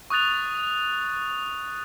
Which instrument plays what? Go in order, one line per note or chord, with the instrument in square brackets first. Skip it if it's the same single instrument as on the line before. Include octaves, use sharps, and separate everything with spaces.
[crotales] C#6 D#6 F#6 A6 F7